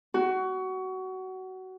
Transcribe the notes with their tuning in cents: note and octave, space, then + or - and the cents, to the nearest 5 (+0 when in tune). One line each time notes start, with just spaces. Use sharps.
F#4 +20